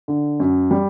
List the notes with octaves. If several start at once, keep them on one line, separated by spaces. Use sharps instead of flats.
D3
F#2
G3